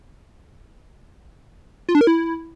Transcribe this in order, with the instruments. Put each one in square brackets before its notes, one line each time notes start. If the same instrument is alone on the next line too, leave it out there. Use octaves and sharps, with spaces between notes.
[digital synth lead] F4
D4
A#4
E4